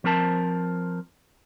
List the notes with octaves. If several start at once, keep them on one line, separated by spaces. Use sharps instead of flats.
F3 C4 A#4 A5